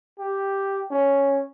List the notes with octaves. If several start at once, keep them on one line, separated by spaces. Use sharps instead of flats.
G4
C#4